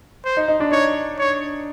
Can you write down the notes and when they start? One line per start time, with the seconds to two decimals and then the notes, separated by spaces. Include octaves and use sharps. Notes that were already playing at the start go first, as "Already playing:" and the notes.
0.25 C5
0.37 D#4
0.48 D#4
0.60 D4
0.71 D#4 C#5
1.18 C#5